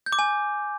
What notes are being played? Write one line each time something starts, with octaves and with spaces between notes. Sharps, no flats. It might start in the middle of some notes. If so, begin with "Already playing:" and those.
G6
D6
G#5